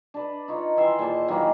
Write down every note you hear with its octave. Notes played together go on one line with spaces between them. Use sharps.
D4 B4
D#4 F4 C#5
D#3 E3 E5 C6
A#2 G#4 C5 A5
D#3 E3 F#3 A#3